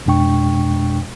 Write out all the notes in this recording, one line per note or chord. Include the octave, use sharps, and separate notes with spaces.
F2 B2 G#3 D4 G5 C#6